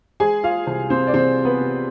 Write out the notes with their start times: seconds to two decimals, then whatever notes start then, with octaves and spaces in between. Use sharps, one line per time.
0.20 G#3 G#4 G#5
0.43 F4 F5
0.67 C2
0.90 C4 C5
1.07 D5
1.14 C2 C4 C5
1.45 B3 B4
1.61 C3